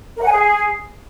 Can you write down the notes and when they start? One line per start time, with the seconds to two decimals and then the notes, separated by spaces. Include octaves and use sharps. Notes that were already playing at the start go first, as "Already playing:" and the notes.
0.16 A#4
0.22 F#5
0.27 G#5
0.32 G#4